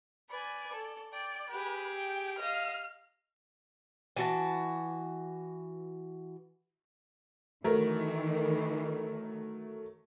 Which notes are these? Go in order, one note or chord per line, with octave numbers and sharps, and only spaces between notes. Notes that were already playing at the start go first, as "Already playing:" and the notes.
B4 D5 G#5
A4
D5 G5
G4 G#4 B4
G5
D#5 F5 F6
E3 F#4 A5
D#3 E3 F#3 A3 A#4